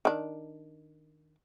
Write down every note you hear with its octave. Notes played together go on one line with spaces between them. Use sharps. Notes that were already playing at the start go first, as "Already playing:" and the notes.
D#3 D4